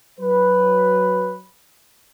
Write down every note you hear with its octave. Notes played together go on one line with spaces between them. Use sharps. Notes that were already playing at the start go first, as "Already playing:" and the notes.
F#3 B4